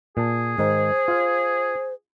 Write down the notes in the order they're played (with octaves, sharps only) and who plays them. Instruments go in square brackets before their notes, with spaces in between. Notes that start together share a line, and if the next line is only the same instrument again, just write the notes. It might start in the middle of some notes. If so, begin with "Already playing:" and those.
[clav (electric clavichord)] A#2 A5 [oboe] G#4
[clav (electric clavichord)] G#2 D#3 D#4 [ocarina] C5
[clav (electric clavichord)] F4 F5